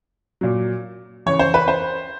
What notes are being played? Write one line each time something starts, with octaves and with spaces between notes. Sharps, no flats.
A#2 F#3
C#3 E3 C#5
C5
B4
C5